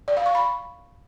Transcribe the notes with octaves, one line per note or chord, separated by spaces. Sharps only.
D5
F5
C#6
B5